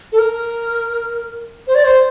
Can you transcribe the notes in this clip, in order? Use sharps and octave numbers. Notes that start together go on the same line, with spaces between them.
A4
A#4
C5
D5
C5